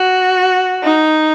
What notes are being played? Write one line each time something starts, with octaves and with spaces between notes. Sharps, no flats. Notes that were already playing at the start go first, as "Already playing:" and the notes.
Already playing: F#4
D#4